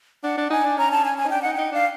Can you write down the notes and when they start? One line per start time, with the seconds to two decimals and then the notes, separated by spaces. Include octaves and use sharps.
0.23 D4 F#5
0.37 D4
0.50 D#4 G#5
0.64 D4
0.78 C#4 A#5
0.91 A5
1.05 G#5
1.18 G#5
1.25 D#4
1.30 D4 G5
1.42 D#4 F#5
1.54 D#4 G5
1.72 D4 F5